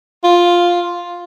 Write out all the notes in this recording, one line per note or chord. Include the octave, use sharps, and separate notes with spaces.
F4